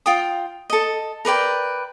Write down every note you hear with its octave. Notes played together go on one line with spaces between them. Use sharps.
F4 G5 D#6
A4 D#5
A#4 B4 D5 G5